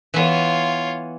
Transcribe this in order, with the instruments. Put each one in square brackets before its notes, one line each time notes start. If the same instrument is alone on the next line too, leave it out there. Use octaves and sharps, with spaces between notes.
[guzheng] E3 B3 [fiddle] F4 C#5